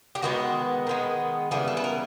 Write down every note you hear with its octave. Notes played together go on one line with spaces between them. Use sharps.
G4
D#3 G#3 B3 F#4
D#3 G#3 B3
C#3 E3 G3 B3 G#4
A4
B4
A#4